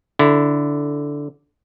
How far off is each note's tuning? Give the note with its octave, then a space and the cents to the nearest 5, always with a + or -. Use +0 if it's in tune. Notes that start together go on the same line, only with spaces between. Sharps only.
D3 -10 E4 +0